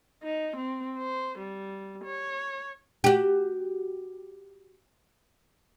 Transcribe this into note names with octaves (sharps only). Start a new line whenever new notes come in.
D#4
C4
C5
G3
C#5
F#4 G4